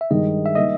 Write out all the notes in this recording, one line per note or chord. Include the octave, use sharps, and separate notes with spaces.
E5
G2 D#3 G#3 D#5
E5
D#3 G3 A#3 D#5